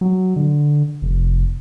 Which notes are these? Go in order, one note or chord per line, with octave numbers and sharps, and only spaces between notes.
F#3
D3
F1